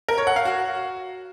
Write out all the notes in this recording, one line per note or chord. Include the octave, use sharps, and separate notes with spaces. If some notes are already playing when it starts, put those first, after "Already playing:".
A#4
C#5
F#5
F5
F#4